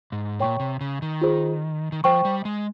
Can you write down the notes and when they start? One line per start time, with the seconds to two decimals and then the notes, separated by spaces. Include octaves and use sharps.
0.12 G#2
0.40 A#2 C#5 G5 C#6
0.60 C3
0.81 C#3
1.02 D#3
1.21 F4 G#4 C5
1.92 D#3
2.04 F3 C5 G5 C#6
2.25 G3
2.45 G#3